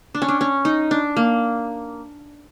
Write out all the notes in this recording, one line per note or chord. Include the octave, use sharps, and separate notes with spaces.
D4
C#4
D4
C#4
D#4
D4
A#3